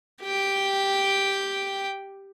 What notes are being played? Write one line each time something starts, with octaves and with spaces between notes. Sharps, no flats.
G4 G5